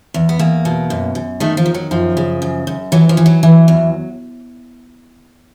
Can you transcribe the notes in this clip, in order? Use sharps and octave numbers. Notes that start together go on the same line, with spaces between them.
E2
B3
E2 A#3
B2
F#2
F#2
D#3 A3
F3
D#3
F#3
F#2 F3
C#3
F#2
F#2
E3 F#3
F3
E3
F#3
E3
E2